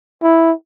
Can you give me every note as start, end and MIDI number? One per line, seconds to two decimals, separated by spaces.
0.23 0.52 64